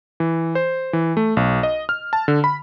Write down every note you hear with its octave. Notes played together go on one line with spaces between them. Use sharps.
E3
C5
E3
A3
B1
D#5
F6
A5
D3
B5